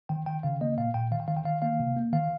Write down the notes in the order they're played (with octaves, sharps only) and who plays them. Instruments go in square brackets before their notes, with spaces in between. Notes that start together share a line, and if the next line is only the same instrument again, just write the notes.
[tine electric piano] D#3 G5
D#3 G5
C#3 F5
A#3 D#5
A#2 F5
A#2 G5
D#3 F5
G5
D#3 F5
G5
D#3 F5
A#3 F5
C3
A#3
D#3 F5